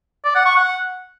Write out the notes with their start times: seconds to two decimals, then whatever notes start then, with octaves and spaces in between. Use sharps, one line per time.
0.25 D5
0.35 F#5
0.46 C#6
0.56 F#5